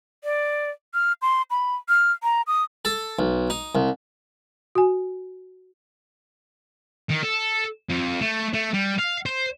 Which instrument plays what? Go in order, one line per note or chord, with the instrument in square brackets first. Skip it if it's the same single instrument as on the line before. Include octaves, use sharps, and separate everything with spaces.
[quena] D5
F6
C6
B5
F6
A#5
D#6
[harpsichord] A4
B1
D#4
C2
[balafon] F#4 G#5
[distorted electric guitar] D#3
A4
F2
A3
A3
G3
F5
C5